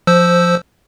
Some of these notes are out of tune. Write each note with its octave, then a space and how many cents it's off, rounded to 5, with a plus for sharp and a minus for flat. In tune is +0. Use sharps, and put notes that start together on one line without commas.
F3 +10 C5 -5 E6 +0